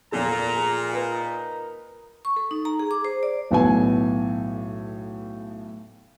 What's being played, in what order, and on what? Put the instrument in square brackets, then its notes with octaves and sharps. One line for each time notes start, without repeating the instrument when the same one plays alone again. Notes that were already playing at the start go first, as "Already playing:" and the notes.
[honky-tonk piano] E2 F3 A4 [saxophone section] A#2 [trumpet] A#5
[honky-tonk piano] G#4
[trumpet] D#4 [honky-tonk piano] A#4 B4
[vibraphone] C#6
A4
D#4
A#5
G#4
D6
C5
D5
[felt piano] B1 A2 E3 B3 A4 G#5